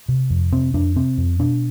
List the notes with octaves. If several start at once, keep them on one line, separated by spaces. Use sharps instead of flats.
C3
F2
C3 C4
F2 D4
C3 C4
F2
B2 D4